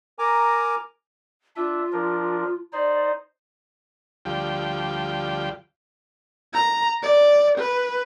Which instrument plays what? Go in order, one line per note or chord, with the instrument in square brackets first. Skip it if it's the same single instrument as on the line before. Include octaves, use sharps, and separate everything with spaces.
[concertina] A#4 G#5 A#5 D6
[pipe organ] D4 E5 [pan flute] F4
[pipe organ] F3 D4 A#4
[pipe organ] D#4 C5 [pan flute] D5
[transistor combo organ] D2 F3 G3 G5
[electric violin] A#5
D5
B4